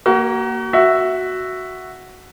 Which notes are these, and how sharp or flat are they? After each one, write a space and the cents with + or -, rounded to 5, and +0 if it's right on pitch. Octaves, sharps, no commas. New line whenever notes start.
A#3 +0 F#4 +35
F#4 +0 E5 +0